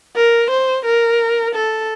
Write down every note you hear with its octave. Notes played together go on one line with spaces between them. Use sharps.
A#4
C5
A#4
A4